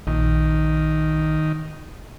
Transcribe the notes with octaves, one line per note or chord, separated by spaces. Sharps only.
A#1 D#3